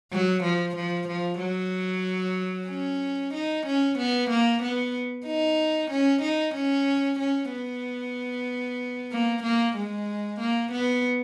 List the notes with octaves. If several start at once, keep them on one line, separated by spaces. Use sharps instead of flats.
F#3
F3
F3
F3
F#3
C#4
D#4
C#4
B3
A#3
B3
D#4
C#4
D#4
C#4
C#4
B3
A#3
A#3
G#3
A#3
B3